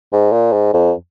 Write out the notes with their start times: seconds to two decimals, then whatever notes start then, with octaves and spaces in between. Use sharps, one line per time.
0.13 G#2
0.32 A#2
0.53 G#2
0.74 F2